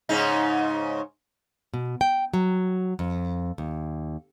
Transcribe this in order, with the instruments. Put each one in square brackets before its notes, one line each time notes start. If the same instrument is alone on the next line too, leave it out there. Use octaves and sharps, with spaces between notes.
[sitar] G#2 C#3 D#4
[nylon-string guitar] B2
G5
F#3
F2
D#2